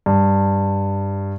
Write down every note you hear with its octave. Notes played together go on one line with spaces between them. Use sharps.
G2